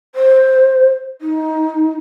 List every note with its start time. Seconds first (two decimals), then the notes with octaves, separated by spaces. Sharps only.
0.15 C5
1.21 D#4